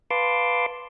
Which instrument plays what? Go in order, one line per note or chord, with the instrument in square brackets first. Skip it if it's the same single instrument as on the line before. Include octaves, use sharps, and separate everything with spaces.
[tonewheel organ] B4 F5 A5 C6 D6